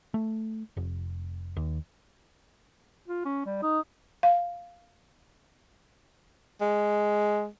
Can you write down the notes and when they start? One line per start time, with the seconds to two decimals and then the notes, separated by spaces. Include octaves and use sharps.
0.14 A3
0.77 F1
1.57 D#2
3.08 F4
3.25 C#4
3.46 G3
3.63 D#4
4.23 F5
6.61 G#3